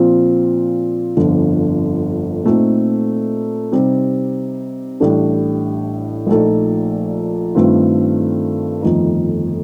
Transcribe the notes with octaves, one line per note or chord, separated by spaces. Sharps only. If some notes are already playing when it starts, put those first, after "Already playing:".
Already playing: A#2 F3 C4 F4
G1 F2 D3 F3
A#2 A3 C4 D#4
C3 G3 C4 D#4 G4
A1 A2 G3 D4 A4
A#1 A#2 A3 D#4 A4
G2 D#3 A3 C4 F4
G1 F2 D#3 A3 D#4